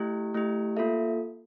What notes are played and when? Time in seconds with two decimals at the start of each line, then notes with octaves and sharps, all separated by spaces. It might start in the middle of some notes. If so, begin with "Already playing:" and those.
Already playing: A3 E4 G4
0.34 A3 E4 G4
0.77 A#3 F4 A4 E5